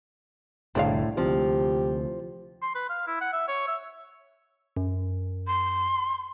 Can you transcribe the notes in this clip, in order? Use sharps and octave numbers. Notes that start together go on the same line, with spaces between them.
F1 C2 A2 D3 C4 D5 F5
D2 C3 F3 G4
C6
B4
F5
E4
F#5
E5
C#5
E5
F#2
C6